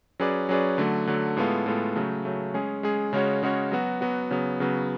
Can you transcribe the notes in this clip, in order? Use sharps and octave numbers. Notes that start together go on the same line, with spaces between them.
F#3 C#4 G#4 B4 D5
F#3 C#4 G#4 B4 D5
D3 F#3 A3
D3 F#3 A3
A2 G#3 B3 F4 A4
A2 G#3 B3 F4 A4
C#3 F#3 A3
C#3 F#3 A3
G#3 C#4 G#4
G#3 C#4 G#4
C#3 G#3 C#4 F#4 C#5
C#3 G#3 C#4 F#4 C#5
F#3 B3 F#4
F#3 B3 F#4
C#3 F#3 B3
C#3 F#3 B3